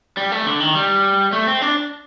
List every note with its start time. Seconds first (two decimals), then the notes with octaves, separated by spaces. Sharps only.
0.17 G3
0.32 A3
0.47 D3
0.60 D#3
0.75 G3
1.33 A3
1.47 C4
1.62 D4